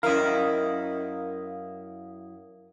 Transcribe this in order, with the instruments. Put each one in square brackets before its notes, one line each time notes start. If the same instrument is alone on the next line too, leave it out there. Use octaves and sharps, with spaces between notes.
[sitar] F#2 E4 [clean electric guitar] A#4 D#5 [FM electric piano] F5 D#6